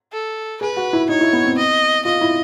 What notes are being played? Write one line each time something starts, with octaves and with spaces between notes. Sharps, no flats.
A4
G#4 B4
F#4
E4
D#4 C#5
E4
B3
C4
D#5
F4 D#5
E4